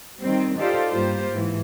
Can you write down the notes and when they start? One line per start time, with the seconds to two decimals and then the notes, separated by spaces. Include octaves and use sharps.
0.20 D#3 G3 C4
0.59 D#4 F4 G4 A4 C5 D5
0.90 G2 A#3 F4 G4 C5
1.32 G#2 E3